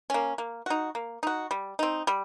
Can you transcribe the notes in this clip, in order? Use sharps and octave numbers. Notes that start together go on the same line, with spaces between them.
A#3 C#4
A#3
D#4 F#4
A#3
D#4 F#4
G3
C4 D#4
G3